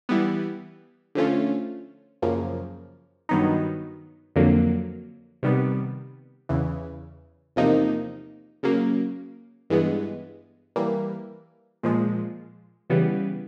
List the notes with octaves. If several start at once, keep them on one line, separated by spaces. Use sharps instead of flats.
E3 G3 B3
D3 F3 A3 C#4 F4
F#2 C#3 F3 A#3
G2 D#3 F#3 B3 D#4
F2 D3 F#3 A#3
C3 D#3 G3 B3
E2 C#3 E3
E2 C3 F3 A#3 D#4
C#3 F#3 A#3
G2 E3 G#3 B3
E3 G3 A#3
A#2 F3 G#3
C#3 E3 G3 B3